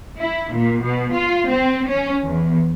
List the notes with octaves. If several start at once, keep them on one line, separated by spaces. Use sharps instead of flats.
E4
A#2
B2
F4
C4
C#4
E2